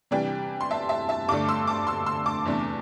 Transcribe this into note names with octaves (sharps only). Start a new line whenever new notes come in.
C3 E3 G3 D4 D5 G5
C6
E5 A5
E5 A5
E5 A5
G2 D3 A3 D4 A5 D6
C6 E6
A5 D6
C6 E6
C6 E6
A5 D6
E2 C3 A3 D4